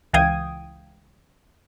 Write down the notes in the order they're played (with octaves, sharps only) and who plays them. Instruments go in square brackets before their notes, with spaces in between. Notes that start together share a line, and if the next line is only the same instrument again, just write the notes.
[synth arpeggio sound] C#2 E3 F5 G5 D#6 G#6